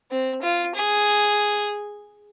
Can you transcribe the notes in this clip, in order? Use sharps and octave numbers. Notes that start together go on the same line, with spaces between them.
C4
F4
G#4